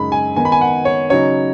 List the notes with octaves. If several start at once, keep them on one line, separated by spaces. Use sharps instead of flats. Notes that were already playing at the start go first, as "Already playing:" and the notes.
Already playing: F#2 C#3 G#3 D#4 B5
G#5
D#3 B3 D#4 G#5
B5
G#5
F#5
C#5
C#3 F#3 D#4 C#5